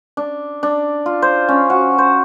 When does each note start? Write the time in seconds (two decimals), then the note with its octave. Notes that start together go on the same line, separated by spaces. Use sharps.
0.17 D4
0.63 D4
1.06 F4
1.22 C5
1.48 C#4
1.70 F#4
1.98 C5